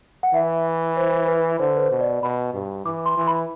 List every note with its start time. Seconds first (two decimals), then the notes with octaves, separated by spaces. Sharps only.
0.23 F#5
0.34 E3 E5
0.97 C5
1.28 B4
1.59 D3 C5
1.77 B4
1.81 C5
1.91 B2
2.01 D5
2.23 B2 B5
2.54 G2
2.85 E3 D6
3.06 C6
3.17 E3
3.27 B5